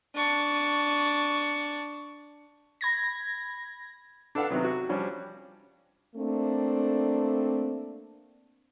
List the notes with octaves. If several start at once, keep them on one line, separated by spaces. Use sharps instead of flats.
D4 C#6
B5 G#6 A#6
D4 A4 B4 F5 F#5
C3 D#3 F#3 B3
F#4
F3 G3 C#4 D4
A3 A#3 C4 D4